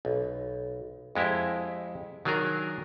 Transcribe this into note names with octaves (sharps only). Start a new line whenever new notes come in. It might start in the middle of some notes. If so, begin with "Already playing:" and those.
B1
F2 G#3 E4 G4
D#3 F#3 D4 G#4 A#4